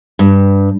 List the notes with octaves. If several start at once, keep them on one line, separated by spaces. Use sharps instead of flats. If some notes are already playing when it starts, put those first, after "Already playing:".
G2